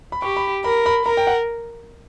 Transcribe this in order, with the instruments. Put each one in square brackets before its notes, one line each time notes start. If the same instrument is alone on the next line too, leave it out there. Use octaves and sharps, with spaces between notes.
[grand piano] B5
[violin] G4 [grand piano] C#6
[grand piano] B5
[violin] A#4 [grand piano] B5
[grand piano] B5
[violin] A#4 [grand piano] A#5
[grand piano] G5
F#5